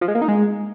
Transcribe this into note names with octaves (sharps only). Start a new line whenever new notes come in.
F3
G#3
A#3
D#4
G#3